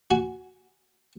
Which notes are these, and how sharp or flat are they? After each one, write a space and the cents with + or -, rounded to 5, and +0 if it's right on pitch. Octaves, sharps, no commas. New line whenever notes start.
F#4 +0 G#5 +0